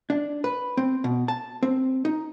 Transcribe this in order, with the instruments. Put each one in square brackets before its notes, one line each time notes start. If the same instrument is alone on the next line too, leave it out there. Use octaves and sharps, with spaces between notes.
[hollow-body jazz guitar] D4
B4
C4
B2
A5
C4
D#4